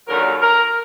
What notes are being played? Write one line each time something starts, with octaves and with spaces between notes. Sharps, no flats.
D#2 D3 F#3 A#4
A#4